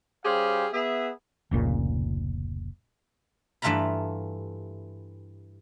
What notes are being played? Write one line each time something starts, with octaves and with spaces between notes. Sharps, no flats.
G3 C#4 G4 G#4 C5 F5
B3 G#4 E5
F1 C#2 A#2 C#3
G2 E3 A3 F4 A#5 B5